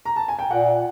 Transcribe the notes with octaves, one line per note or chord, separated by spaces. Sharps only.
A#5
A5
G#5
G5
A#2 F#5